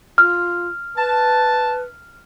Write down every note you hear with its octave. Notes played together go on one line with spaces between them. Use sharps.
F4 F6
B4 A5